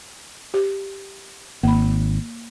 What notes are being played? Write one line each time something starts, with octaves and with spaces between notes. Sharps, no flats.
G4
G#1 A#3 B5